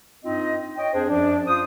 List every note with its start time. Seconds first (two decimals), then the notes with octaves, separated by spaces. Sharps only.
0.25 G2 C4 D#4 F4 D#5
0.76 C#5 D#5 G5
0.93 F2 D4 G#4 C5
1.08 F#2 F3 D4
1.47 F4 C5 D#6